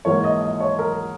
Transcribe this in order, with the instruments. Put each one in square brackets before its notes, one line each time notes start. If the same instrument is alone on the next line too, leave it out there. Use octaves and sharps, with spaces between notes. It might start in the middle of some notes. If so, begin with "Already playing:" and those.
[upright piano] G#2 E3 A#3 C#5
D#5
D#5
C#5
A#4